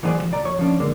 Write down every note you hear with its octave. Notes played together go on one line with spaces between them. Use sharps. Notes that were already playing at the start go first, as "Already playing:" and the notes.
E3 F#3 D4 G#4 C5 D5
C2 F3
C2 D5 A#5
F2 C#5
F3 C#4 D4
F2 D3 G#3 A#3